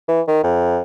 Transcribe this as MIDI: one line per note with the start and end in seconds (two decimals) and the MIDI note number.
0.09 0.22 52
0.28 0.43 51
0.44 0.81 41